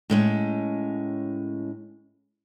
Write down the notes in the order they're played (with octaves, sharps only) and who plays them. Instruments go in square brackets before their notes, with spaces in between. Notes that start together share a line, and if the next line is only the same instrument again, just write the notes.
[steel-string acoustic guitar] A2 G#3 C#4